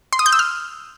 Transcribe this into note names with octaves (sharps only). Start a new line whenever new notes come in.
C6
D#6
G6
E6
F6